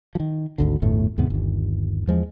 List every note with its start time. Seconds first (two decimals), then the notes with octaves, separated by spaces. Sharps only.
0.15 D#3 F3
0.58 G#1 D2 D3
0.82 G1 E2 A2 A3
1.18 D#2 G#2 C3 B3
1.30 G1 D#2
2.07 E2 F3 G#3